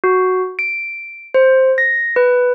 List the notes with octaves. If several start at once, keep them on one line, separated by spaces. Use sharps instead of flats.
F#4
D7
C5
A#6
B4